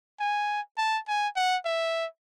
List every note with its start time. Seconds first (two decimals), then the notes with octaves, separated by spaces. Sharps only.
0.20 G#5
0.78 A5
1.08 G#5
1.36 F#5
1.65 E5